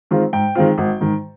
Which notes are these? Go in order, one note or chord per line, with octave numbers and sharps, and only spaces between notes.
D#3 G#3 C4 F4
G#2 G5
D#3 G#3 C4 F4
G#1
G#2 D#3